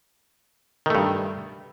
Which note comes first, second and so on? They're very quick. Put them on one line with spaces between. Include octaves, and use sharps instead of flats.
D#3 A3 G2